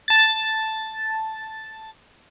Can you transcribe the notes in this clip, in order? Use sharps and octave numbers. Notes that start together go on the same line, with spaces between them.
A5 A6